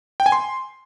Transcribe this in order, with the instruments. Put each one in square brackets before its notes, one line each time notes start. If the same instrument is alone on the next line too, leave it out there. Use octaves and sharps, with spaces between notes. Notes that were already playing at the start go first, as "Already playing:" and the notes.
[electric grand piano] G5
G#5
C6